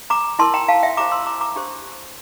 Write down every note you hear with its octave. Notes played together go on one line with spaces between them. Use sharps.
A#5 D6
E4 A#4 A5 C6
G5 A#5
F5 A5
E5 G5
E4 G4 C5 A#5 D6
C6 E6
A#5 D6
A#5 D6
D4 G4 C5